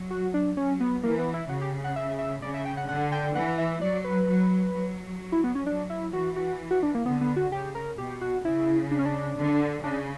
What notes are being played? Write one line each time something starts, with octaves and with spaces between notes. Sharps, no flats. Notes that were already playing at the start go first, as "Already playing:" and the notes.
Already playing: F#3
F#4
D4
F#3 C#4
B3
E3 A#3
B3
E4
C#3 F#4
G4
F#5
E5
E5
C#3 D5
E5
G5
F#5
D3 F#5
G5
E3 F#5
E5
F#3 D5
B4
F#3
F#3
E4
B3
C#4
F#3 D4
E4
E3 F#4
F#4
F#4
D4
A#3
D3 B3
B3
F#4
C#3 G4
A#4
B2 G4
F#4
C#3 E4
D4
C#4
D4
D3
C#3 D4